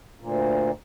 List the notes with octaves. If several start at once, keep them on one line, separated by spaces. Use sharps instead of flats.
D2 A#2